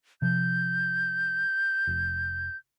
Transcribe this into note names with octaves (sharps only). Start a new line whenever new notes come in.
C3 F3 G6
F1